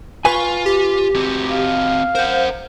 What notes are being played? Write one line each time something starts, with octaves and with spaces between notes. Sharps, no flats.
F4 B4 G#5 C#6
G4
C4 F#4
F5
A#4 C5 F#5